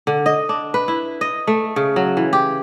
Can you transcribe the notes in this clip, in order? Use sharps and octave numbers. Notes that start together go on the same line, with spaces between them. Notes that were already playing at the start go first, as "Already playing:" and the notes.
D3
D#5
D4
B4
E4
D#5
A3
C#3
F#3
E3
G4